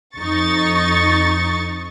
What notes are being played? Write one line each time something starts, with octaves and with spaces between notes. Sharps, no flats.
F2 D#4 C#6 A6